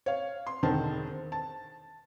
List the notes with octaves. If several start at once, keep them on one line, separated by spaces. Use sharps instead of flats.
C#5 F5
C6
E1 D3 D#3 C4 C5 A5
A5